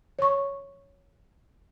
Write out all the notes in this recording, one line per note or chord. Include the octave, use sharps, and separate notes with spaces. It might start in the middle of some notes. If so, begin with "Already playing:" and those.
C#5 C#6